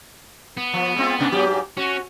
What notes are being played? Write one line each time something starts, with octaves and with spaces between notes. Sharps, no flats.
B3
F3
G#3 C4 F4
G#2 C3 D4
G#2 F#3 G4
C#4 F#4